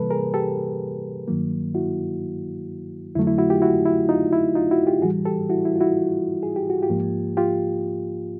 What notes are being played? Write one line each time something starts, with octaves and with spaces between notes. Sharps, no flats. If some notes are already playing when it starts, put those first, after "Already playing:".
Already playing: C3 E3 G3 A#3 A4 B4
G#4 A#4
G4 A4
G2 D#3 F#3 A#3
E4 F#4
F2 D3 F#3 A3 E4
E4
E4 F#4
F4 G4
E4 F#4
E4
D#4 F4
E4
D#4 F4
E4 F#4
F4 G4
A2 E3 G3 F#4 G#4
G4 A4
E4 F#4
E4
F4
E4 F#4
G#4
G4
F#4
F4 G4
G#2 F3 A#3
F4 G4